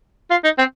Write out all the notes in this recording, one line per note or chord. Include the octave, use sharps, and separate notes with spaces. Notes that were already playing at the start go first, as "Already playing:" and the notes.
F4
D#4
C4